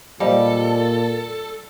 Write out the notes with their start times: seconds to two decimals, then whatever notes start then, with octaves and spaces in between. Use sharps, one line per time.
0.20 A#2 G3 A4 C5 D#5 F5